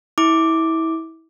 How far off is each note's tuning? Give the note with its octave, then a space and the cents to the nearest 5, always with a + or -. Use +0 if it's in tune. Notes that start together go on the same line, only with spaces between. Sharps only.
E4 -25 D6 +0